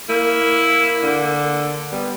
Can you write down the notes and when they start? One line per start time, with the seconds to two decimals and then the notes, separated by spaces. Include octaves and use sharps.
0.09 A#3 E4
1.03 D3
1.92 G3 B3